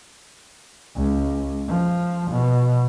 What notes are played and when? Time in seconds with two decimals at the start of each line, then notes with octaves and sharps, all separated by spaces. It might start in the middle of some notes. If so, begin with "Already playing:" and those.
0.96 C#2
1.68 F3
2.31 B2